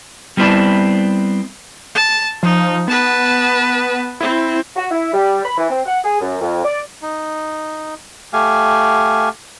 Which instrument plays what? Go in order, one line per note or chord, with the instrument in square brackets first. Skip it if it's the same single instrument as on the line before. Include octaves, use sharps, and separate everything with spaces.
[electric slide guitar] G3 B3 C4 E4 D5 A5
[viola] A5
[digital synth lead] F3 [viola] D#4
[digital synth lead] B3 [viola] B4 A5
[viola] C4 [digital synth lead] E4
[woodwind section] F#4
E4
G3
B5
E3
C4
F#5
G#4
F#2
F2
D5
[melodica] D#4
A3 G4 F5 G#5